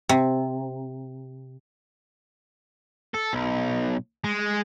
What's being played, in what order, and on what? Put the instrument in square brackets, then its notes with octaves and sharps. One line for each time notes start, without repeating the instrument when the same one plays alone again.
[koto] C3
[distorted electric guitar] A4
B1
G#3